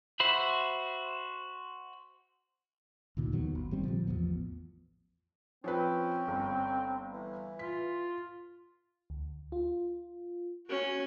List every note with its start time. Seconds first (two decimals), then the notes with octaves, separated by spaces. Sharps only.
0.20 F#4 C5 E5 B5
3.17 D2 A#2 D#3
3.32 D#2 D#3 F#3 B3
3.55 G#1
3.71 G#1 G3 C4
3.84 A#2 D3 F3
4.07 A1 E2 F3 B3
5.64 F3 C4 C#4 B4
6.28 G1
7.13 E3
7.59 F4 B6
9.10 D2
9.52 F4
10.67 C#4 F#4